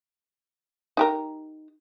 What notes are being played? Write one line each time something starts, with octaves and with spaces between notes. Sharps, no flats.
D#4 G4 A#4